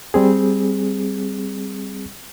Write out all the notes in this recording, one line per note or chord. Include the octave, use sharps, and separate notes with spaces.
G3 C4 G#4